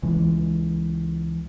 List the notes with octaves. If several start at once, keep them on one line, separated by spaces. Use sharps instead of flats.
C#2 E3 G#3